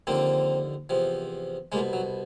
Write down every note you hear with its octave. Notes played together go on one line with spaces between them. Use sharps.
D#2 D3 F3 A#3 C4
E2 C3 F3
C2 B2 G#3 A#3
F#3